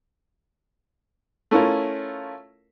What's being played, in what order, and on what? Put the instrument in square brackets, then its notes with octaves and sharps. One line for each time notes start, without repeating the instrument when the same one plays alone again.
[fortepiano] A3 C#4 E4 F4 A#4